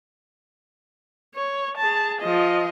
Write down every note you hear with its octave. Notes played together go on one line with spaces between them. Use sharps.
C#5
G#4 A5
F3 D#5